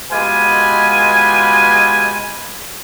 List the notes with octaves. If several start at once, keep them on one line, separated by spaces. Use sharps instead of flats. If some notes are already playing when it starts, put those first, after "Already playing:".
B2 G#3 F4 G4 B4 G#5